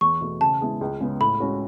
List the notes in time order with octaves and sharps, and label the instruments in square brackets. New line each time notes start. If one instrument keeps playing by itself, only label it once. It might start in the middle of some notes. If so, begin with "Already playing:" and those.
[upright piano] E2 [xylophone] C#6
[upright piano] B2 A3
[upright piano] C#3 [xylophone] A5
[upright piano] G#3 B3 E4 G#4
C#2
C#3 G#3 B3
[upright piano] A2 [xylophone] B5
[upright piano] G#3 C#4 F#4